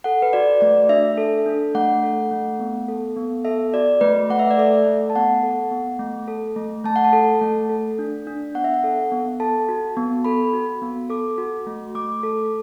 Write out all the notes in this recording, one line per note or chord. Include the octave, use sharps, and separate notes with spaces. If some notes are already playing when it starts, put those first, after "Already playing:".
A4 F#5
B4
F#4 D5
A3 D5
D4 E5
A4
D4
A3 F#5
A4
A3
B3
A4
B3
A4 E5
F#4 D5
A3 B4
A3 F#5
E5
D5
A4 E5
A3
A5
B3 F#5
A4
B3
A3
A4
A3
A3 A5
F#5
A5
A4
A3
A4
D4
D4
B3 F#5
E5
F#5
A4
B3
A4 A5
F#4
B3
A4 B5
F#4
B3
A4 D6
F#4
A3
A3 D6
A4